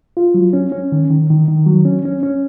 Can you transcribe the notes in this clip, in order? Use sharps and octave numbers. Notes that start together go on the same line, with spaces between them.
F4
F#3
C#4
C#4
D#3
D#3
D#3
D#3
F#3
C#4
C#4
C#4